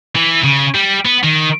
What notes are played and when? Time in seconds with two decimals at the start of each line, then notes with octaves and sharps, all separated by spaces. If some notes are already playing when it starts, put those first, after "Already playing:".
0.16 E3
0.44 C#3
0.74 G3
1.05 B3
1.23 D#3